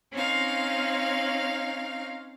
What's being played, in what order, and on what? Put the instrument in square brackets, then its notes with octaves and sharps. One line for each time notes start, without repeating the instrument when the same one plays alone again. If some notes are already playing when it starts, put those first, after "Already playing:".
[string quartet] C4 C#4 D#4 F5